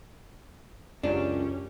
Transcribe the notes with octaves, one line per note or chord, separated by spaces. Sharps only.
C#2 F#2 C#4 D4 G4